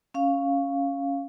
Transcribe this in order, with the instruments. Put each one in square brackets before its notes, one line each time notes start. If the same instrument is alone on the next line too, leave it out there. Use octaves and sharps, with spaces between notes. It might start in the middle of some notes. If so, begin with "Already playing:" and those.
[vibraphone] C#4 F5